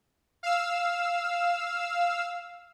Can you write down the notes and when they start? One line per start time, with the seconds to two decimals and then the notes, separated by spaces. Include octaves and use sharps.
0.43 F5 E6